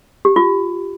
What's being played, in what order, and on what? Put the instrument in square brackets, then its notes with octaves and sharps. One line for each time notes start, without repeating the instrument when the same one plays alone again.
[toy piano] G4
F4